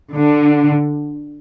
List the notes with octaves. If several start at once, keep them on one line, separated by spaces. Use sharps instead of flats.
D3